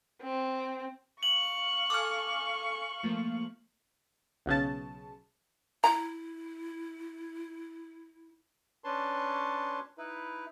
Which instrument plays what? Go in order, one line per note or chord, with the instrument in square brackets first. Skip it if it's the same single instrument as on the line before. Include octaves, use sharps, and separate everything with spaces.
[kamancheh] C4
[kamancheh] F5 C#6 [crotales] F#7
[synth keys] A4 G#5 [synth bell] D6 F6
[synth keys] F3 A3 A#3
[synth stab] B1 C#3 A5
[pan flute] E4 [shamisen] A#5
[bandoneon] C#4 D4 B4 C#5 A5 C6
D#4 E4 B4